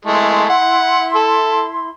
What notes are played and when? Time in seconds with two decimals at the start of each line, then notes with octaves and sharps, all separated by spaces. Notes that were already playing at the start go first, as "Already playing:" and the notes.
0.05 G#3 A3 E4 C6
0.50 F#5
1.16 A4